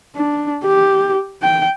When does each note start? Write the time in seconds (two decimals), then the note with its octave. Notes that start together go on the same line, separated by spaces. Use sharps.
0.15 D4
0.64 G4
1.43 G5